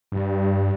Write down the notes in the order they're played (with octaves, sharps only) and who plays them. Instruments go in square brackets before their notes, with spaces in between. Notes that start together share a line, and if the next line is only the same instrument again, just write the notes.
[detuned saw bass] G2